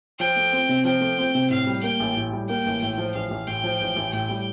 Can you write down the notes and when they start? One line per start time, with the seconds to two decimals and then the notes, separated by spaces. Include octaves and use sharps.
0.20 F3 G5
0.36 A3
0.52 C4
0.69 C3
0.85 F3 G5
1.01 A3
1.18 C4
1.35 C3
1.50 A2 F5
1.67 G3
1.83 A#3 G5
2.00 A1
2.17 A2
2.33 G3
2.49 A#3 G5
2.66 A1
2.82 A2 G5
2.98 F3
3.15 A1 F5
3.30 A1
3.47 A2 G5
3.64 F3
3.81 A1
3.96 A1
4.13 A2 G5
4.29 G3